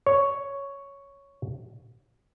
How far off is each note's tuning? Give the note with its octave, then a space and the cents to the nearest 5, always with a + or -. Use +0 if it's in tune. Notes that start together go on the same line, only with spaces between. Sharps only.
C#5 +5